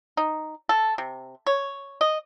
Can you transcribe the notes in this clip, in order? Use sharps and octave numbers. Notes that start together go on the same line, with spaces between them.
D#4
A4
C3
C#5
D#5